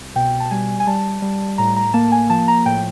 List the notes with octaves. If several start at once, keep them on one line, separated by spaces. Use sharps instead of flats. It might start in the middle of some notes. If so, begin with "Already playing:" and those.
Already playing: C2
B2 G5
A5
G3 G#5
G#5
G3 A5
G3
A2 A#5
A#5
A#3 A5
G#5
F3 A5
A#5
A2 G5